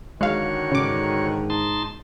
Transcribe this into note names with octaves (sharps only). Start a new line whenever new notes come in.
D3 D#3 G#3 F#4 C#5 F5
G#2 C#3 D6
D#4 A5 C6